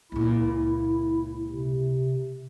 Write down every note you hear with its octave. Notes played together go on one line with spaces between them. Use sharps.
C#2 A#2 E4
C3